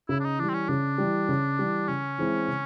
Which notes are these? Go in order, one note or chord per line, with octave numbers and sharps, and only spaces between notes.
C#3 E4
D4
D#4
E3 G3 D4
C4
C#4
C#3 D4
E3 G3
C#3
E3 G3
C#3 C#4
E3 G#3 C4 E4
C#3